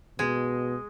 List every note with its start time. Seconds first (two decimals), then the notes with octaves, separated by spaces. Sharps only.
0.19 B2 G#3